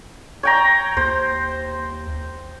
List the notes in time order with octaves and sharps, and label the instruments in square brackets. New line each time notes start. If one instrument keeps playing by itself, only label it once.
[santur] C#5 G5 A#5
[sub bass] D#2 [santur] C5